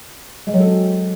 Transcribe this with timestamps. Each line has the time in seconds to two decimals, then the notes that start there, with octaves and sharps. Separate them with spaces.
0.47 G#3
0.54 F#3
0.60 A4
0.67 C4